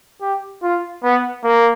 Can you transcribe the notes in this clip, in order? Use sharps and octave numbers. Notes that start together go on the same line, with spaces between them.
G4
F4
B3
A#3